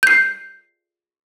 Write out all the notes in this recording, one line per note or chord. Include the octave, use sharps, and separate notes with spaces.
G6 C7